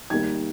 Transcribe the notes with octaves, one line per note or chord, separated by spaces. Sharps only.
D#3 G3 A#3 G#6